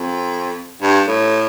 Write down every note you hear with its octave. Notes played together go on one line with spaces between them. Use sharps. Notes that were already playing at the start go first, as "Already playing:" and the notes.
Already playing: F2
G2
A2